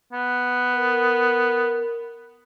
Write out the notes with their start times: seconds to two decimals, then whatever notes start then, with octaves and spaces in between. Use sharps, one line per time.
0.13 B3
0.76 A#4